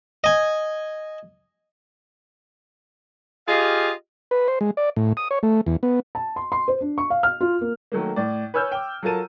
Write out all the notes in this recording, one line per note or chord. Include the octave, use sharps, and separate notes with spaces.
D#5 G#5
F4 G4 G#4 D#5 F5
B4
C5
G#3
D5
A2
D#6
C#5
A3
E2
B3
A5
C6
C6
C5
D4
C#6
F5
F6
F4
A#3
D#3 F#3 A3 A#3
A2 D5
B4 C#5 G#5 E6 F6 G6
G5 D6
F#3 F4 A4 A#4 A5 D#7